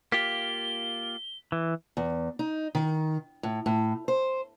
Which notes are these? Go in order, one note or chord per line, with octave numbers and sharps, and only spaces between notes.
A#3 F4 G4 B6 G7
E3
E2
D#4
D#3
A2
A2
C5